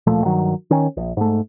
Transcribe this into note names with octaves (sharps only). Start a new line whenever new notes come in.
D1 A#2 F3 A3
G2 D#3 F#3
D#3 C#4
A#1
G#2 A3